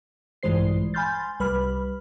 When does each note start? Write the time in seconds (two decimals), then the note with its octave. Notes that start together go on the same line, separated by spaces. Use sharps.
0.43 A#1 G2 E3 G#3 C5 C7
0.94 G#5 B5 C6 F6 G6 A6
1.40 C2 G3 B4 B5 F6